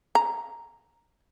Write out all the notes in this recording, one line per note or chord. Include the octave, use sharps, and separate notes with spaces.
A#5